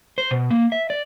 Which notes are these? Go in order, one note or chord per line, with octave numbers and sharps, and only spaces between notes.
C5
B2
A#3
E5
D5